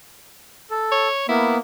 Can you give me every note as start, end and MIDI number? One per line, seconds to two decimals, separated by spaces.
0.71 1.08 69
0.92 1.27 73
1.29 1.58 58
1.29 1.58 59
1.29 1.57 64